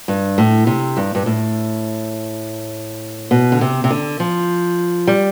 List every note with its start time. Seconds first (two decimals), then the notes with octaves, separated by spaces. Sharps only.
0.08 G2
0.38 A2
0.67 C3
0.97 G2
1.15 G2
1.26 A2
3.31 B2
3.52 D3
3.61 C3
3.84 C3
3.90 D3
4.20 F3
5.07 G3